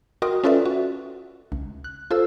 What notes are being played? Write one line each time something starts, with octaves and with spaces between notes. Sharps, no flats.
F#4 A#4 D#5 G5 C6 D#6
C#4 F4 A4 B4 D5 E5
F#4
C#2
F#6
F4 A4 C5 E6